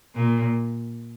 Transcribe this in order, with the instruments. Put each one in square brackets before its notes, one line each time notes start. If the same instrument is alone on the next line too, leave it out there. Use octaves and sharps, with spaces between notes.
[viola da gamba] A#2